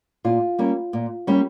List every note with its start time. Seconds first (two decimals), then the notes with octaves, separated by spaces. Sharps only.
0.24 A#2 F4
0.59 G3 A#3 C#4
0.93 A#2
1.27 G3 A#3 C#4